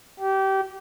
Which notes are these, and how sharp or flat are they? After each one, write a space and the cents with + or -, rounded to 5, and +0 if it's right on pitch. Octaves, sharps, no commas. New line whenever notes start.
G4 -25